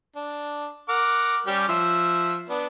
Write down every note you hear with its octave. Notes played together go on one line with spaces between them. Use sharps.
D4
A#4 F#5 D6
G3 C#4 G4
F3 E5
B3 D4